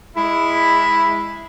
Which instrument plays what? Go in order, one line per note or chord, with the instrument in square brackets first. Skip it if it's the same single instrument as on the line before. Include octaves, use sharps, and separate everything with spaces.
[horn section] G#3 E4 [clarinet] B5